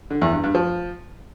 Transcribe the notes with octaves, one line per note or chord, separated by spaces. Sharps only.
D3
E2
G2
G2
F3